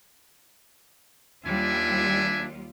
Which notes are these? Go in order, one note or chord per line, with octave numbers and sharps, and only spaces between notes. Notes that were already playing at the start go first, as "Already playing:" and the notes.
D#2 G3 D4 F4 E5 G#5